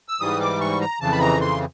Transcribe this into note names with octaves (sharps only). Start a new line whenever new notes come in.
E6
G#2 E3 G3 D#6
D6
C#6
A#5
F2 C#3 E3 A5
B5
A#5
C6